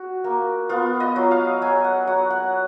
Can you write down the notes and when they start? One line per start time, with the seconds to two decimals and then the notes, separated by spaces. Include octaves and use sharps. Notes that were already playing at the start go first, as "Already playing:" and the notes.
Already playing: F#4
0.24 A#3
0.69 B3 F4
1.00 D#5
1.16 F#3
1.31 F5
1.62 F#3 G#5
1.84 F#5
2.07 F#3 F#5
2.31 F#5